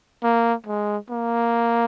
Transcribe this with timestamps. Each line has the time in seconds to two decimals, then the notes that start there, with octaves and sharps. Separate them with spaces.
0.23 A#3
0.67 G#3
1.10 A#3